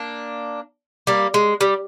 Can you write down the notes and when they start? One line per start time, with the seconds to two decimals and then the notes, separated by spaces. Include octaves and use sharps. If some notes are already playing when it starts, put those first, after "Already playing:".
Already playing: A#3 D4
1.07 G3 A#3
1.34 G#3
1.61 G3